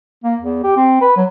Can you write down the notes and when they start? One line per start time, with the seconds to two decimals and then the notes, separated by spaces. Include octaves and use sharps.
0.24 A#3
0.41 E2
0.64 G4
0.77 C4
1.01 B4
1.16 F#3